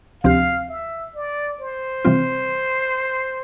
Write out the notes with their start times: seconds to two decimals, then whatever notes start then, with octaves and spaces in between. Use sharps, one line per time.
0.24 D2 C3 F3 C4 G4 F5
0.69 E5
1.15 D5
1.60 C5
2.05 C3 E3 G3 C4 F4